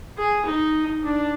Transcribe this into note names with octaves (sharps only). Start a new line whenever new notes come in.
G#4
D#4
D4